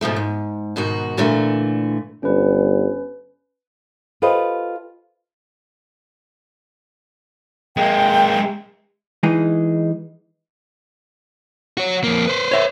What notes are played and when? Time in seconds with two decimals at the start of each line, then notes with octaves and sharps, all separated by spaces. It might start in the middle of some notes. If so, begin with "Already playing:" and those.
0.01 G#2 B2 F3 A3
0.16 G#2
0.76 G#2 B2 D#3 F#4
1.17 A#2 D3 E3 A3 E4
2.23 G1 C#4 B4
4.22 F4 G4 A4 B4 C5 D#5
7.77 G#3 A#3 G5
9.23 E3 G#3 D#4 G#4
11.77 F#4 C#5
12.04 F2 A#3
12.27 B4 C5
12.51 C#5 E5